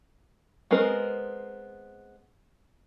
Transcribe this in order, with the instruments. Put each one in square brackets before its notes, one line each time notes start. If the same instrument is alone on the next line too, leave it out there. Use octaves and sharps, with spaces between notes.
[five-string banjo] G#3 B3 C4 A#4